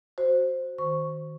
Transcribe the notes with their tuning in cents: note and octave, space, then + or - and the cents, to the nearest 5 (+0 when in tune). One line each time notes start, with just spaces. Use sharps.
F#4 +0 C5 +0
D#3 +0 C5 +0 C#6 +0